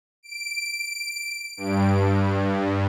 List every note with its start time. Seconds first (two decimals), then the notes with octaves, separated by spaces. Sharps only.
0.23 D7
1.57 G2